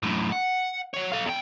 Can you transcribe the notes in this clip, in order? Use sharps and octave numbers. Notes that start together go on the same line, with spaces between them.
F#2 A2
F#5
F#3 C#5
A4 F5
E2 G5